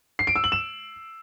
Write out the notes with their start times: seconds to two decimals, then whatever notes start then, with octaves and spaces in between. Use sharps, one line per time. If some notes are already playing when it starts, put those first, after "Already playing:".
0.19 C7
0.27 D7
0.36 E6
0.44 F#7
0.52 E7